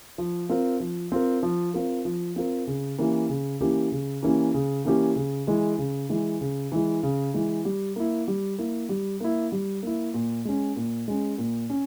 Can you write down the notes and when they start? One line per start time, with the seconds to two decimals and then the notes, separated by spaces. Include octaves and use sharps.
0.18 F3
0.50 C4 F4 A#4
0.80 F3
1.12 C4 F4 A#4
1.43 F3
1.74 C4 F4 A#4
2.05 F3
2.36 C4 F4 A#4
2.67 C#3
2.98 E3 A#3 C#4 G4
3.29 C#3
3.61 E3 A#3 C#4 G4
3.92 C#3
4.23 E3 A#3 C#4 G4
4.54 C#3
4.85 E3 A#3 C#4 G4
5.16 C#3
5.47 E3 G#3
5.79 C#3
6.09 E3 G#3
6.41 C#3
6.72 E3 G#3
7.03 C#3
7.34 E3 G#3
7.65 G3
7.96 A#3 E4
8.28 G3
8.58 A#3 E4
8.89 G3
9.20 A#3 E4
9.52 G3
9.83 A#3 E4
10.14 A#2
10.45 G#3 C#4
10.76 A#2
11.08 G#3 C#4
11.38 A#2
11.70 C#4